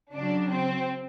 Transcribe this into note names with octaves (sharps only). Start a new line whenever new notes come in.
C#3 F#3 D4
C4